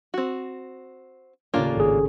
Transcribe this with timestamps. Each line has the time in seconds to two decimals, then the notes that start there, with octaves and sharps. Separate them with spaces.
0.14 C4 F#4
1.54 D#2 A2 C#3 A#3 D4 F4
1.77 G#1 G#4